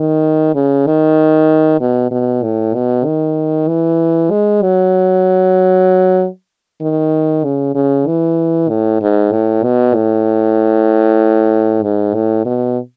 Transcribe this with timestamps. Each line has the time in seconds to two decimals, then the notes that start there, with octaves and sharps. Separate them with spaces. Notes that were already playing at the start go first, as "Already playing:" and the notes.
Already playing: D#3
0.55 C#3
0.86 D#3
1.81 B2
2.11 B2
2.43 A2
2.75 B2
3.05 D#3
3.68 E3
4.31 G#3
4.62 F#3
6.81 D#3
7.44 C#3
7.75 C#3
8.08 E3
8.69 A2
9.01 G#2
9.32 A2
9.63 B2
9.95 A2
11.83 G#2
12.14 A2
12.46 B2